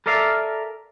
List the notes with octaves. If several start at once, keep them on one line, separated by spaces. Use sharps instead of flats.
A4 A#4 D5 E5 F5